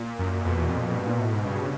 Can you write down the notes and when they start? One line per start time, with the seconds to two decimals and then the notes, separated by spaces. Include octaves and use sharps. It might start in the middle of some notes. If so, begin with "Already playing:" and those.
Already playing: A#2
0.19 F#2
0.44 F2 B2
0.57 E2
0.69 F2
0.82 F2
0.94 G2
1.07 A#2
1.20 A2
1.32 G#2
1.45 G2 C#3